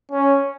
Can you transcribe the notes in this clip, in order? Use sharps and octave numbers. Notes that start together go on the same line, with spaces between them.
C#4